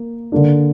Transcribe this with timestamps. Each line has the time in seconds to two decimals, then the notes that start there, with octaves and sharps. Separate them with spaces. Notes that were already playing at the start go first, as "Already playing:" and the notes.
Already playing: A#3
0.32 D3 A#3 D4